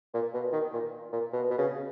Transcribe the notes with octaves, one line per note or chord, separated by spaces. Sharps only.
A#2
B2
D#3
A#2
A#2
B2
B2
C#3